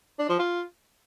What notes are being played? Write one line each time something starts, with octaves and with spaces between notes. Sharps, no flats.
D4
F3
F4